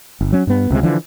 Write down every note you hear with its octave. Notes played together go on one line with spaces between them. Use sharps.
G1
F#3 C#4
G2 B3
C#2 C3 G#3
D3 E3 F3